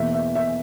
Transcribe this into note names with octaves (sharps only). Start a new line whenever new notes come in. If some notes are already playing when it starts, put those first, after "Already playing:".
Already playing: E2 B2 A#3 E5
E5
E5